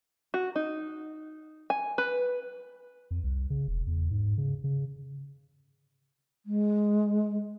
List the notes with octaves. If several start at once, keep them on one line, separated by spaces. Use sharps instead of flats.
F#4
D#4
G#5
B4
F2
C2
C#3
E1
E2
G#2
C#3
C#3
G#3